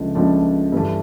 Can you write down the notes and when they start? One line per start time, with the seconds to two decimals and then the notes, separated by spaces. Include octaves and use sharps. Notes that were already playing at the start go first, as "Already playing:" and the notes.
Already playing: C#2 C#3 F3 A3 D4
0.15 C#2 C#3 F3 A3 D4
0.72 G2 E3 A3